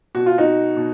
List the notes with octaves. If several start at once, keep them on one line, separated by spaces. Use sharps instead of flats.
B2 F#4
F4
D#4 F#4
B2